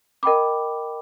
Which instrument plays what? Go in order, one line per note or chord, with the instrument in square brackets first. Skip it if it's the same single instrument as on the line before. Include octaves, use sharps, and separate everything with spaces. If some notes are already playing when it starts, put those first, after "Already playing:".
[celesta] A#4 D#5 G5 B5 D6